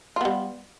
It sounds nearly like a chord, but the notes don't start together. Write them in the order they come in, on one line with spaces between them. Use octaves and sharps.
F4 B3 G3